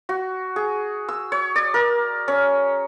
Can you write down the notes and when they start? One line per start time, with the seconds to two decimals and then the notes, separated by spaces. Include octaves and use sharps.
0.09 F#4
0.56 G#4
1.09 E6
1.32 C#5
1.56 D5
1.74 A#4
2.28 C#4